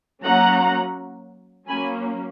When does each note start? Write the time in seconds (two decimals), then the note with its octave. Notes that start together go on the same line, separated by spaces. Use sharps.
0.24 F#3 A#3 C#4 F#5 A#5
1.68 F#3 A#3 C#4 G#5 B5